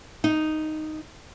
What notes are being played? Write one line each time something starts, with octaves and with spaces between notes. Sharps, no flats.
D#4